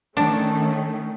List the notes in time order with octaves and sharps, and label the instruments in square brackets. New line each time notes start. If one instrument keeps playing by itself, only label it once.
[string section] D#3 A3 C#4 [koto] D4